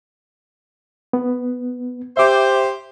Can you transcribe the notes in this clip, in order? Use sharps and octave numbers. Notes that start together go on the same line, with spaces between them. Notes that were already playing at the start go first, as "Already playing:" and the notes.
B3
G4 C5 E5 D6